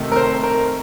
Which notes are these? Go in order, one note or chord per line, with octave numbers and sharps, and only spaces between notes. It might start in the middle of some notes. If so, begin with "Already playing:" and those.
Already playing: C3 D#3 A3
A#4
C5
A#4